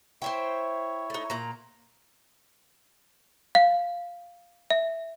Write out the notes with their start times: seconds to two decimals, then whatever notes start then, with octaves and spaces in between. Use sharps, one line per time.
0.22 E4 C5 C#5 E5 G5
1.10 A3 D#4
1.30 A#2 A#5
3.55 F5
4.70 E5